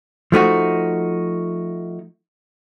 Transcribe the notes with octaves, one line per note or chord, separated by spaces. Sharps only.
F3 A3 D#4 F#4